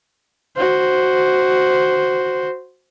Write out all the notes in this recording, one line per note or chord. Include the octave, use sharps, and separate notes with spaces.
F#4 C5